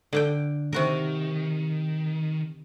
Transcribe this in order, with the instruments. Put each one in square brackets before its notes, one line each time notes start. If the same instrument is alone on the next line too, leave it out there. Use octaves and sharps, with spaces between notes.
[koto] D3 D4 G5
[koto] C3 F#4 A#4 [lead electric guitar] D#3